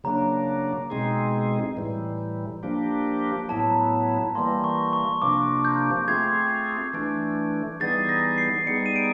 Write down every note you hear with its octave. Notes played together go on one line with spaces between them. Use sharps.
C#3 F#3 A#3 D4 A#5
B2 G#3 C4 D#4 G#4
A2 E3 G3
F3 A#3 D4 G4
A2 F#3 B3 E4 A5
A#5
E3 G3 A#3 C6
C#6
C#6
C3 F3 A#3 D4 D6
G6
A3 C4 F4 G#4 G#6
E3 A3 D4
E3 G3 B3 D#4 G#4 A6
A#6
C7
G3 B3 D#4 G#4 C#7
D#7
D7